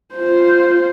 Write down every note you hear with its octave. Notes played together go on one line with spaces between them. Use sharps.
F4 C5